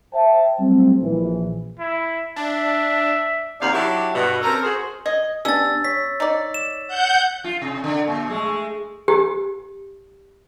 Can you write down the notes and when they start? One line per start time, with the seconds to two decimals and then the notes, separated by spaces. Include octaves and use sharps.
0.13 C5 E5 G5 A5
0.59 F#3 G3 A3 C4
1.02 A#1 E3
1.79 E4
2.36 D4 E5
3.60 D#2 C3 D4 G4 F5 F#5
3.74 F#3 D4 E4 G4
4.14 G2 B2
4.42 C4 C#4 A4 A#4
4.63 F#4 G#4 C5
5.06 D#5 G#6
5.45 B3 C#4 D4 G4 E6 A6
5.84 C#5 B6
6.20 D#4 D5
6.54 E7
6.88 F#5 G6
7.44 F4
7.62 C3
7.84 D3
8.07 A#2
8.30 G#3 A3
9.08 G4